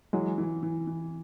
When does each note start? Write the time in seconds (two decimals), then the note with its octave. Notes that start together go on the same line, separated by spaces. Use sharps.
0.13 E3 F#3 G#3
0.38 E3
0.63 E3
0.87 E3